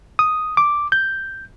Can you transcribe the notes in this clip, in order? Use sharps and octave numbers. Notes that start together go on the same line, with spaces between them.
D#6
D6
G6